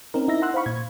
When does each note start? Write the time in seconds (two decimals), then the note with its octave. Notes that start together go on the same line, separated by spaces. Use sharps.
0.14 C4 C#4 D#4 A#4
0.28 D#4 E4 E5 A#6
0.42 F#5 C6 E6 F#6
0.54 C5 F5 B5 C#6
0.66 A#2 G#6